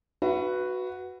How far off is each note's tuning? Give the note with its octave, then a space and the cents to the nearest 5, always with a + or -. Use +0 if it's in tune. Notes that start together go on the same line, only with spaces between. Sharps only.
F#4 +0 B4 +0 E5 +45